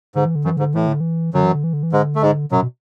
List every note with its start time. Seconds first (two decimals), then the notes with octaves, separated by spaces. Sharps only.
0.15 G#2 D3
0.26 E3
0.35 D3
0.45 F#2 E3
0.57 G#2 D3
0.74 A2 E3
0.87 D3
1.00 E3
1.34 F#2 D3 F#3
1.44 E3
1.54 D3
1.64 E3
1.73 D3
1.83 E3
1.92 G#2 D3 G#3
2.15 A3
2.22 G#2 G#3
2.51 F#2 B2 F#3
2.62 B2